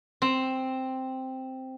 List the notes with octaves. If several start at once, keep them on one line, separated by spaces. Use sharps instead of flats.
C4